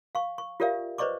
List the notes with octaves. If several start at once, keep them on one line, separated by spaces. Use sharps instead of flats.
F5 C#6
C#6
F4 G4 A#4 D5 E5 F5
B4 C5 D5 D#5 C#6 D6